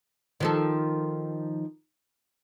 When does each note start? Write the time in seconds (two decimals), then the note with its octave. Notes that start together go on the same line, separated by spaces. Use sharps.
0.40 D#3 F3 A4